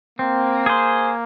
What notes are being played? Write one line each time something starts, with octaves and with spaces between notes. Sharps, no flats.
A#3 C4
G#4 C5